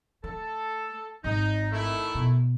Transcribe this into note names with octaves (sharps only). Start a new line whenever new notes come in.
A3 A4
G#1 D#4
D#3 A3 E4
B2